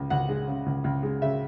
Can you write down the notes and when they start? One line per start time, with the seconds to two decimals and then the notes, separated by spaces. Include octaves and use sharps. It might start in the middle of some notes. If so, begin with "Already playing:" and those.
Already playing: C#2 C#3
0.10 C#2 F#5
0.29 G#3
0.48 C#3
0.66 C#2
0.84 C#2
1.03 G#3
1.22 C#3 E5